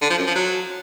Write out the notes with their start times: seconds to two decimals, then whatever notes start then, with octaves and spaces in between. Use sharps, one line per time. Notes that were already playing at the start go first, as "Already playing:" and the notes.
0.02 D3
0.10 F3
0.19 F#2
0.27 F3
0.35 F#3